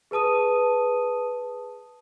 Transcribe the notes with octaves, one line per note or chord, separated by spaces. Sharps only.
G#4 B4 A5 D#6 D#7